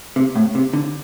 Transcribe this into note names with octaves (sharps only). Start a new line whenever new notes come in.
C3
A2
C3
D3